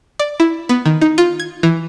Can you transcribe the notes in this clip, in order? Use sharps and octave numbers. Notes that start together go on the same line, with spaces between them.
D5
E4
B3
D#3
D#4
F4
G#6
E3